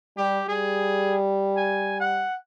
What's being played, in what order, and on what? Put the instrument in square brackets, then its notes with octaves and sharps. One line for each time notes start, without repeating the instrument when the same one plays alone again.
[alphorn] G3 [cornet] G4
[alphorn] G3 [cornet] G#4
[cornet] G#5
F#5